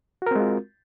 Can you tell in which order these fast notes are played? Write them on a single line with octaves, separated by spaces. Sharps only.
F#4 A#4 C4 G#3 F4